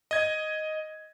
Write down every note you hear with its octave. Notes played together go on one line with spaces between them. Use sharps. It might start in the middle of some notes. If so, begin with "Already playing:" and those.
D#5 G#6